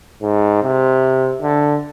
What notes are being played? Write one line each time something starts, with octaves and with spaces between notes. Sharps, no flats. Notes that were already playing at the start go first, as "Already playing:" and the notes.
G#2
C3
D3